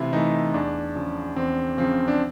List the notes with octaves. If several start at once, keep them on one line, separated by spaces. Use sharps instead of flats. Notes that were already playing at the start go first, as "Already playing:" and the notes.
Already playing: C3 E3 A3 E4 F4
E3 A3 D#4
E2 D4
C#3 F3
E2 C4
C#3 F3 C4
D4